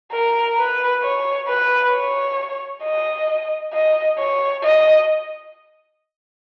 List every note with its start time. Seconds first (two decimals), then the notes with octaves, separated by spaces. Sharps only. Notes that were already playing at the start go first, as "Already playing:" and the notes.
0.12 A#4
0.58 B4
1.03 C#5
1.48 B4
1.93 C#5
2.83 D#5
3.73 D#5
4.18 C#5
4.63 D#5